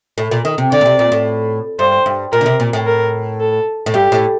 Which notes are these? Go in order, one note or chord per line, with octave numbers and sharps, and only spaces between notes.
A2
A#2
D#3
C3
D3 D5
A#2
C3
A#2
A2
G2 C5
G2
A#2 A#4
D3
C3
A#2
A2
A#4
A4
A2
G2 G4
A2